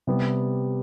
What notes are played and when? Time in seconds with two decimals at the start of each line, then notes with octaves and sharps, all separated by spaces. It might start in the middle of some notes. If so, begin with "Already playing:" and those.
0.07 C3 G3 B3